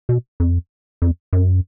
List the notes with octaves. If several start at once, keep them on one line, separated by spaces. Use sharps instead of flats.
B2
F2
F2
F#2